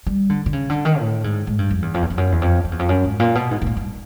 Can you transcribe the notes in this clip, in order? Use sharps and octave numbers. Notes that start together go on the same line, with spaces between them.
G3
D3
D3
C#3
D3
D#3
A2
G#2
G#2
G2
F2
E2
F2
E2
F2
F#2
E2
F2
F2
E2
F2
F#2
G#2
A#2
B2
G#2
G#2
A2
G2